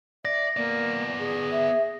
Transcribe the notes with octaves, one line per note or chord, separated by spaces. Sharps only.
D5 E5 A#6
A#3 B3 D5
G#4
E5